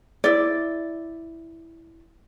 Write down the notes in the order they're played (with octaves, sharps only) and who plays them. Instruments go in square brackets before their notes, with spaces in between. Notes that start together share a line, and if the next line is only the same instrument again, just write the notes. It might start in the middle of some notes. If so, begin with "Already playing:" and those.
[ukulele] E4 D5